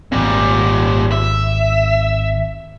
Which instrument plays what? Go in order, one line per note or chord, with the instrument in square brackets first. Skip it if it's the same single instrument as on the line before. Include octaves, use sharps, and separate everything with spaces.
[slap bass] G#1 C4 [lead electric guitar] A#2 G3
[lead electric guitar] E5